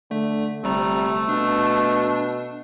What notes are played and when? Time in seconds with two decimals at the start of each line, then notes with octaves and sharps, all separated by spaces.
0.11 D3 A3
0.64 G1 C3 G3 A3 A#5
1.29 B2 D4